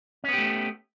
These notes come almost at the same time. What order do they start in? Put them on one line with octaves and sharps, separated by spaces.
C#4 B3 G4 A3